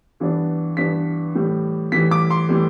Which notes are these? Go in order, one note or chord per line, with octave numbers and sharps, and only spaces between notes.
G2 E3 B3 D4
G2 E3 B3 D4 B6
A2 E3 G3
A2 E3 G3 B6
D6
C6
A2 E3 G3